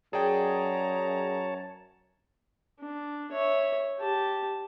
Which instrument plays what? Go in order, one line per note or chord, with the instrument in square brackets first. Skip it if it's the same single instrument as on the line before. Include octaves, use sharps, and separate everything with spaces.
[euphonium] F#2 [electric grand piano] G#4 D5 G5 [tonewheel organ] C#5 A5 [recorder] A#5
[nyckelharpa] D4
C#5 E5
G4 A5